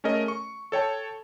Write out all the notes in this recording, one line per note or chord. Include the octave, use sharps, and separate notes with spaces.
A3 C#4 G#4 A#4 D#5
C#6
A4 C#5 G5 A5